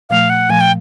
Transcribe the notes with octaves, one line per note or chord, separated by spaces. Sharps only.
A#2 F3 A3 F5
F#5
A#2 F3 A3 G#5
G5